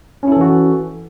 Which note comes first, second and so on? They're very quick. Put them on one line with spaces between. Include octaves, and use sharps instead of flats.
C#4 E4 A4 E3 F#4